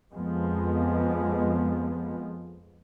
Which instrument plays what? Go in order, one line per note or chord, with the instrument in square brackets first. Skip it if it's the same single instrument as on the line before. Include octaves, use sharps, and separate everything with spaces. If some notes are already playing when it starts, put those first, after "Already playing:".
[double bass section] F2 F3 G#3 B3